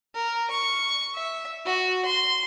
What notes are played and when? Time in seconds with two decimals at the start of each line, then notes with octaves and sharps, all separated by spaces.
0.15 A#4
0.50 C#6
1.15 E5
1.65 F#4
2.05 C6